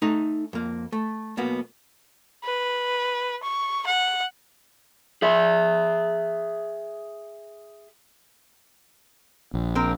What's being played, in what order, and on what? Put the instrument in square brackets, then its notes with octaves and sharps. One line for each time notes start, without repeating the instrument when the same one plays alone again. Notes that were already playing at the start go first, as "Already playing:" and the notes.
[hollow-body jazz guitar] A3 D#4 A#5
F2 A#3
A3
B1 B2 A#3 B3
[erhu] B4
C#6
F#5
[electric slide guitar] G#4 E5
[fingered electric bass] A#1
[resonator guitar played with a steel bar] C4 A#4